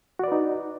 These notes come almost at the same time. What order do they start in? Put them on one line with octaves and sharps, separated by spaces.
F#4 D5 B4 D#4